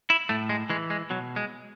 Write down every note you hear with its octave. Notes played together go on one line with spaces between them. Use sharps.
E4
A2 A3
G#3
E3 G#3
G#3
B2 F#3
G#3